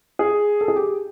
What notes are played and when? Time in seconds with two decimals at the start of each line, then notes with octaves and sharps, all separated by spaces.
0.19 G#4
0.61 A4
0.68 G#4
0.76 G4